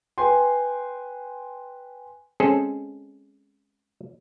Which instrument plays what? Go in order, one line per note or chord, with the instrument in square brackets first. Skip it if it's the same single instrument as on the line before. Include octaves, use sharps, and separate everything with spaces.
[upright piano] B4 G5 G#5 C6
[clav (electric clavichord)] G#3 C4 C#4 G#4 A4 C5